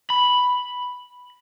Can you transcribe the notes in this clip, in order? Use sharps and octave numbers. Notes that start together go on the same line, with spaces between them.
B5